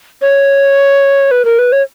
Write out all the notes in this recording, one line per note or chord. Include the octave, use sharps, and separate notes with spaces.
C#5
B4
A#4
B4
C#5